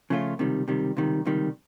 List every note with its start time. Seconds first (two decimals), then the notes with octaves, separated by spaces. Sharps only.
0.10 C#3 F3 A3 C#4 F4
0.39 C#2 C3 D#3 G3
0.68 C#2 C3 D#3 G3
0.97 C#2 C3 D#3 G3
1.25 C#2 C3 D#3 G3